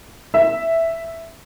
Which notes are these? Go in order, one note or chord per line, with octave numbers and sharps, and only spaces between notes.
E5